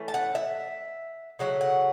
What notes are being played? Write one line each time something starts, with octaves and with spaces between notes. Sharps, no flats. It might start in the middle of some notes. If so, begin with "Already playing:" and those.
Already playing: E3 A3 C#4
A5
F#5
E5
C#3 F#3 A3 F#5
F#5